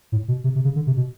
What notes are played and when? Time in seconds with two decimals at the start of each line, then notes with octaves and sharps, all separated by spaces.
0.12 A2
0.28 B2
0.44 C3
0.55 C3
0.65 C#3
0.76 D3
0.87 C3
0.97 B2